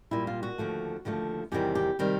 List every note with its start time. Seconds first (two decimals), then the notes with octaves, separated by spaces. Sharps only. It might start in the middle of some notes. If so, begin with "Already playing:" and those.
0.11 A#2 G3 E4
0.27 F4
0.43 F#4
0.58 D#2 D3 F3 A3
1.05 D#2 D3 F3 A3
1.52 E2 C3 D#3 G3 G4
1.75 G4
1.99 C3 D#3 G3